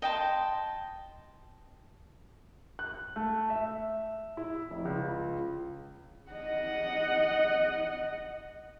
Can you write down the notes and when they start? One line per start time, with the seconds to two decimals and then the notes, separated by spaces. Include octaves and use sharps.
0.02 D#5 G5 A5 C6
2.79 F#6
3.16 A3
3.50 E5
4.37 E4
4.70 F1
4.85 C#2
6.31 D#5 F#5